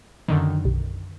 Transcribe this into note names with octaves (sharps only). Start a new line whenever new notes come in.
F#2 D3 D#3
B1